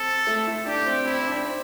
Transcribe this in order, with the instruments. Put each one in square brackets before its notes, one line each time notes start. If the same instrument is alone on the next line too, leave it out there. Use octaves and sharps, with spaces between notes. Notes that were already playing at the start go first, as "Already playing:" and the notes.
Already playing: [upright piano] C4 [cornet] A4
[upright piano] A3
E4
[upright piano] D4 [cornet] G4
[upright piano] C4
[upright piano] C4 [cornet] E4
[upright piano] C4
D4
C4
C4